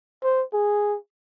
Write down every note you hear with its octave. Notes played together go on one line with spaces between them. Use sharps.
C5
G#4